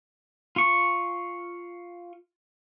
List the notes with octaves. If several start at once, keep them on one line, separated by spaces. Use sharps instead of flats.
F4 C#6